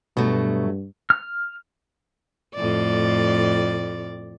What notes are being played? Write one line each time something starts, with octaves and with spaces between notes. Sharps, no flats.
G2 B2 F#3 A3
F6
F2 A2 D5